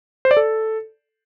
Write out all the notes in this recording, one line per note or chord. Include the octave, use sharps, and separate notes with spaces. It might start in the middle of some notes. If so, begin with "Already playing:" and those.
C5
D5
A4